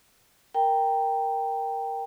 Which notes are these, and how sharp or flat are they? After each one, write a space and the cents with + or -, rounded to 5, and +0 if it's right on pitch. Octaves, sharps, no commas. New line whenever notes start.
A#4 +0 G5 +0 A#5 +0